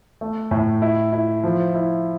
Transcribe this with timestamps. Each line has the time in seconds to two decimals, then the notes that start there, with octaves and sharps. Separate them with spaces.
0.21 A3
0.51 A2
0.82 E4
1.13 E4
1.43 F3
1.75 E4